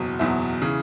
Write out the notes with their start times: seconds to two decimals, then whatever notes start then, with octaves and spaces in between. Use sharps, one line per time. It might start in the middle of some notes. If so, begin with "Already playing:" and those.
Already playing: F#1 E2 B2 F#3
0.19 F#1 E2 B2 F#3 E5
0.61 C#3 E3